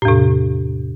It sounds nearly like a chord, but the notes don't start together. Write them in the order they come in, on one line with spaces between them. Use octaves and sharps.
A2 E2 C3